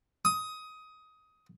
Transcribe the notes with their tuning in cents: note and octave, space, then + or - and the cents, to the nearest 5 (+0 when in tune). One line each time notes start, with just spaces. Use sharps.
D#6 +15